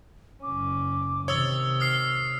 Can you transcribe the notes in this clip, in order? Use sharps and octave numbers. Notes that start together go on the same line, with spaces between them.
F#1 C#4 D6
C3 D#3 C#5 D#6 E6 A6 G7
D#6 F6 C7